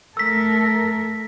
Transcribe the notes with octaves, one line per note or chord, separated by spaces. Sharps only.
A3 A4 A#4 E6 B6